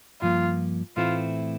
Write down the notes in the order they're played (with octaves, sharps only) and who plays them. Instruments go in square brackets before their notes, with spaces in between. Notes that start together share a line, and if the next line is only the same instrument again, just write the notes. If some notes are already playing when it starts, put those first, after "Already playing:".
[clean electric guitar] G2 F3 A#3 [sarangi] F4
[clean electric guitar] A2 E3 A3 C4 E4 [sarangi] F4